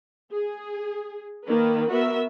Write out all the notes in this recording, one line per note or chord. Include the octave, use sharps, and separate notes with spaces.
G#4
D#3 A#3 A#4 B4
B3 F#4 A#4 E5